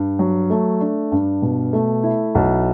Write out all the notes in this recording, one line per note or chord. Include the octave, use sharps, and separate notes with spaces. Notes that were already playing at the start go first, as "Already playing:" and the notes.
Already playing: G2
F#3
A3
D4
G2
B2
A3
E4
B1